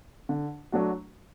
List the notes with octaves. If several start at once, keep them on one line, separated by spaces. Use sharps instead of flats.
D3
F#3 A3 D4 F#4